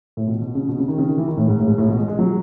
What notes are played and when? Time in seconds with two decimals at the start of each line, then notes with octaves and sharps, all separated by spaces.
0.17 A2
0.27 B2
0.41 B2
0.55 C#3
0.69 B2
0.78 C#3
0.88 D#3
0.98 C#3
1.09 D#3
1.18 E3
1.28 D#3
1.37 A2
1.48 G#2
1.59 A2
1.68 G#2
1.78 A2
1.88 B2
1.97 G#3
2.08 G#3
2.19 F#3